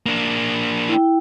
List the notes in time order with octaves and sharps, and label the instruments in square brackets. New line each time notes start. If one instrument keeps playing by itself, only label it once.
[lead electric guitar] A#3 D4
[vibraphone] E4 G5